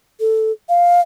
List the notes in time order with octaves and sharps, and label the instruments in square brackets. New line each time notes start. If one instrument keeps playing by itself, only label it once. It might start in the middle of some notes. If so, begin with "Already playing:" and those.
[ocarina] A4
F5